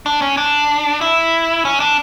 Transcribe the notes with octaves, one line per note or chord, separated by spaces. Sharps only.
D4
C#4
D4
E4
C#4
D4